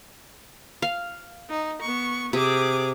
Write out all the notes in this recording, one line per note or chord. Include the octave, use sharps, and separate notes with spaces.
F5
D#4
B3 C#6
C3 G#4 D6